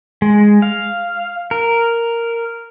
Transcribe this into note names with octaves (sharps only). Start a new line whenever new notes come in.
G#3
F5
A#4